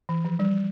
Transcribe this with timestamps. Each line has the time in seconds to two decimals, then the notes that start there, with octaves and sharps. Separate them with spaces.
0.09 E3
0.25 F3
0.39 G3